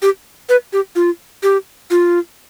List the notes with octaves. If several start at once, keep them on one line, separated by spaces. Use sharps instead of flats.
G4
B4
G4
F4
G4
F4